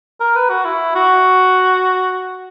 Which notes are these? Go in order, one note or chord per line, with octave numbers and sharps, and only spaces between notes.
A#4
B4
F#4
E4
F#4